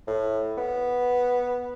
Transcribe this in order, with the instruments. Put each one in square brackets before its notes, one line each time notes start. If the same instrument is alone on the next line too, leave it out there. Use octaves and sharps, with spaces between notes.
[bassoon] A2
B3